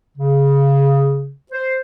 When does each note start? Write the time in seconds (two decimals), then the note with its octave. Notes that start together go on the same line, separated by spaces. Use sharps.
0.18 C#3
1.52 C5